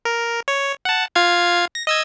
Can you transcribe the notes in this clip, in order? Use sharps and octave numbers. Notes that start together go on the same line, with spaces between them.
A#4
C#5
F#5 A5
F4 F5 G#6
A#6
D#5 E6 G#6